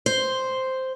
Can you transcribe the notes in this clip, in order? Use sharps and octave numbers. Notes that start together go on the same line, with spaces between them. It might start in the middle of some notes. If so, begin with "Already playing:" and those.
C5